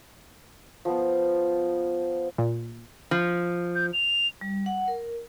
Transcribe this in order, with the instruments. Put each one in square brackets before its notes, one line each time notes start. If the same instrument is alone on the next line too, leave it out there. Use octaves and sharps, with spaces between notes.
[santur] F3 B3
[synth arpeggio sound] A#2
[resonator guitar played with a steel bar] F3
[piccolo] G6
F7
[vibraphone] G3
F#5
A#4